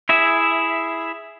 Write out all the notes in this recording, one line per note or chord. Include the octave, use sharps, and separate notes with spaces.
E4 G#4 E5